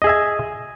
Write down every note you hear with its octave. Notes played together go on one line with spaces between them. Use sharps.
G#4 D#5 E5 G#5